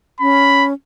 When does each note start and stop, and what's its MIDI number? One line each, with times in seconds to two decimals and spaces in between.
0.20 0.73 61
0.20 0.66 83